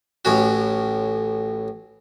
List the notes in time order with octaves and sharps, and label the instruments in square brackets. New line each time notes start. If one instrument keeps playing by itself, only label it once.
[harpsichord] A1 A2 C#4 F#4